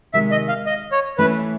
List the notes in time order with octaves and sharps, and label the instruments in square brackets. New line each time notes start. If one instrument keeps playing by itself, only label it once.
[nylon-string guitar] C3 D#3 G#3 [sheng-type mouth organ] E5
[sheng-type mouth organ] D#5
F5
D#5
C#5
[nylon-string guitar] E3 A3 C#4 E4 [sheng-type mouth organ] B4